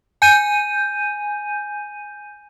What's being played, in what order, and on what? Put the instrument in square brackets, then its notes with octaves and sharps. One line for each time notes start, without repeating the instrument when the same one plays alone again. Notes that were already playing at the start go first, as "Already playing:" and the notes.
[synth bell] G#5 G6 D#7